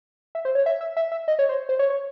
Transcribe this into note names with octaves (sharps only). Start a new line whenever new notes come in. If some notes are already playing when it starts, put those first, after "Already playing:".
E5
C5
C#5
E5
E5
E5
E5
D#5
C#5
C5
C5
C#5
C#5